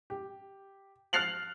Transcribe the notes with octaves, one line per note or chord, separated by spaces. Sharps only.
G4
F6 F#6 A6 C7 F7 F#7